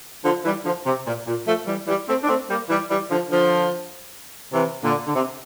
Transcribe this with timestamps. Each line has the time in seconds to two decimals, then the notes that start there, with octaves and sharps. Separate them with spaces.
0.25 D3 F3
0.45 E3 G3
0.65 D3 F3
0.86 C3
1.06 A#2
1.27 A#2
1.47 F3 A3
1.67 E3 G3
1.88 E3 G3
2.08 A3 C4
2.23 D4
2.28 A3 C4
2.50 G3 A#3
2.69 E3 G3
2.90 E3 G3
3.11 D3 F3
3.31 D3 F3
4.53 C3 E3
4.84 A#2 D3
5.07 D3
5.14 C3